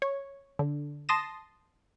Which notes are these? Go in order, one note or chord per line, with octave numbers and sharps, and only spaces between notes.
C#5
D3
A5 C6 D#6 A#6 E7